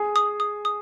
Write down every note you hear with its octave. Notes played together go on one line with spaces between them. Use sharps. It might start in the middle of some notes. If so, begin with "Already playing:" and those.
Already playing: G#4
D#6
D#6
D#6